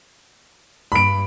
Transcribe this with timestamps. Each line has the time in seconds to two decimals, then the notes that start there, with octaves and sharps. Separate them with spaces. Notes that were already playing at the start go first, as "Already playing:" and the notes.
0.92 G2 B5 D7